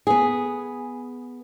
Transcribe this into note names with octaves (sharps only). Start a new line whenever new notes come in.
B3 G#4